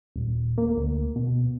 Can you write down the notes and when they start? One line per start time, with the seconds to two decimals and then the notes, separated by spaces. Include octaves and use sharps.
0.16 D#1
0.58 A#3
0.77 D2
1.16 B2